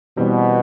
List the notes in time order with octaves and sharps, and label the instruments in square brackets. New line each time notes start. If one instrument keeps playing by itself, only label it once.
[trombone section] B2 [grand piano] E3 G3 C4